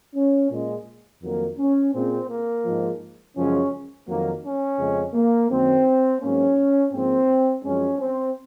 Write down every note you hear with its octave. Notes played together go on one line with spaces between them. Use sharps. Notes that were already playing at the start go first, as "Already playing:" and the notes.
C#4
A#2 G#3
F2 D#3 F#3 A#3
C#4
A#2 G#3 C4
A#3
G#2 F3 G#3
F#2 C#3 F3 G#3 C#4
F2 D#3 F#3 A#3
C#4
F2 C#3 G#3
A#3
F#2 D#3 F#3 C4
G#2 F#3 A#3 C#4
G#2 F3 A#3 C4
F#2 F3 G#3 C#4
C4